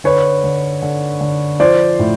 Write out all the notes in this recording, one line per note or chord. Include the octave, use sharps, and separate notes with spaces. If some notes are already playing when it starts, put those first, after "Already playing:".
D3 B4 C#5
D3
D3
D3
F3 C5 D5
A2